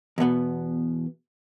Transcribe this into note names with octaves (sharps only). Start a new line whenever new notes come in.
E2 B2 B3